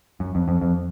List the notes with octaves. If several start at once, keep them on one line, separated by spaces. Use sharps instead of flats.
F#2
F2
F2
F2